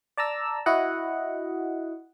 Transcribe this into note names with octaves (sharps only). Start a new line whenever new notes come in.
D5 A5 A#5 E6
E4 F#4 D#5 F#5